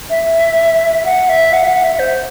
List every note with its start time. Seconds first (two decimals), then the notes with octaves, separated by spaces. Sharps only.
0.10 E5
1.06 F#5
1.29 E5
1.53 F#5
1.64 E5
1.68 F#5
1.84 E5
1.99 C5